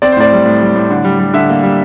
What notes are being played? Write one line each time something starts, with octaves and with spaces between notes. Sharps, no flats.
C4 D5
C5
A2 D5
G3
A2
G3
A2
D3
G3
G3
D3 E5
A#3
G3